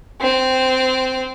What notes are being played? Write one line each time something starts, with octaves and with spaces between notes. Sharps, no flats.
C4